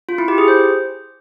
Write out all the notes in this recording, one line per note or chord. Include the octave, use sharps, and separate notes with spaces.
F4
E4
G4
G#4
C5